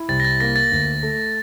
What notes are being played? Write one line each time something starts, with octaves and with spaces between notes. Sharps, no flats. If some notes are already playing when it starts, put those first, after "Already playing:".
Already playing: E4
C2 A6
A#6
A6
A#3 A#6
A6
D2
A3